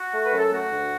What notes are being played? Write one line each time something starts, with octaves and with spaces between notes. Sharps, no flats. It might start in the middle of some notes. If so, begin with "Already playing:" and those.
Already playing: F#4
A3
B4
F#2
A4
A3 F#4
D2